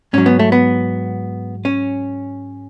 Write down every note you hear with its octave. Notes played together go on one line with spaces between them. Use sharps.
G#2 F#3 C#4
B3
A3
B3
C#4